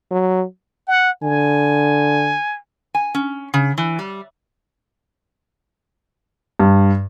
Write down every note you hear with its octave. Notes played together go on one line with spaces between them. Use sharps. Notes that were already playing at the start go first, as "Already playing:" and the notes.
F#3
F#5
D3 G#5
G#5
C#4
C#3
E3
G3
G2